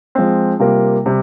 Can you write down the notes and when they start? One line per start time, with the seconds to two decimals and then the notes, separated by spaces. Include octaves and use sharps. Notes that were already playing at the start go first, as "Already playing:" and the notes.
0.15 F3 G#3 C4
0.60 C3 G3 A#3 F4 A#4
1.06 C3 G3